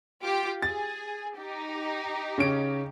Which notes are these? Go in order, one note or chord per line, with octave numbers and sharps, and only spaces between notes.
F4 G4 D6
G#4 A6
D#4 G4
C#3 C#4 D7